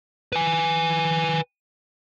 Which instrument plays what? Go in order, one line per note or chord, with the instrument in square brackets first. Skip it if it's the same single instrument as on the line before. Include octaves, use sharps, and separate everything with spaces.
[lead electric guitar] B4 G#5